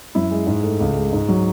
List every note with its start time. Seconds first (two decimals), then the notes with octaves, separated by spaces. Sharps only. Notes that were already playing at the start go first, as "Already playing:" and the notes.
0.15 F#2 E4
0.31 G#3
0.47 G#2
0.63 A3
0.80 C#2
0.96 G#3
1.13 G#2
1.28 F#3